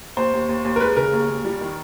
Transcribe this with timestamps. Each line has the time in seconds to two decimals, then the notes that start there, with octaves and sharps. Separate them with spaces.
0.17 D#2 C5
0.33 D#2
0.49 D#2
0.65 D#2
0.76 A#4
0.81 G#3 B4
0.96 C#3 A#4
1.13 D#2
1.29 D#2
1.45 G3
1.61 D#3